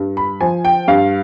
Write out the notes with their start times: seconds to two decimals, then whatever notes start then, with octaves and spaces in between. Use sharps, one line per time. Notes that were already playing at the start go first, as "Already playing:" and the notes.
Already playing: G2
0.17 B5
0.41 F3 G#5
0.65 G5
0.88 G2 F5